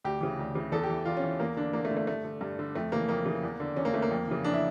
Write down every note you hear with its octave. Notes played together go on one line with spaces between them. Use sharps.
D2 G4
C#3 E3
D2
C#3 E3
E2 A4
G4
E3
E2 F4
C#4
E3
E2 A#3
D3 D4
E2 A#3
A3
D3
A3
G2 A3
D3
G2
D3
F2 A3
C#3 E3 A#3
F2 A#3
C#3 E3
E2
D3
E2 C#4
A#3
D3 A3
A#3
F2
C#3 E3
F2 D4
E4